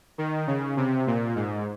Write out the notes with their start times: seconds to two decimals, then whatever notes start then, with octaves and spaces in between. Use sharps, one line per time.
0.18 D#3
0.47 C#3
0.77 C3
1.07 A#2
1.36 G#2